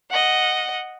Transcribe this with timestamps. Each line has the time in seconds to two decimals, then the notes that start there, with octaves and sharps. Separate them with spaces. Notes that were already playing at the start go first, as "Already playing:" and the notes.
0.10 D#5 F#5